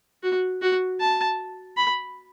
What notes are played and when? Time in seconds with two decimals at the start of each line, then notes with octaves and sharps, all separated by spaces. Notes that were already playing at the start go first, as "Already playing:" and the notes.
0.23 F#4
0.62 F#4
1.00 A5
1.77 B5